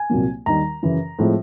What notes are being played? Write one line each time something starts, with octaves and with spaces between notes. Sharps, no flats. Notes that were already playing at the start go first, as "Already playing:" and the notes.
Already playing: G#5
C2 A#2 F#3 A#3
D#2 D#3 G3 A#5
F#2 C#3 E3
A2 F3 G#3 C4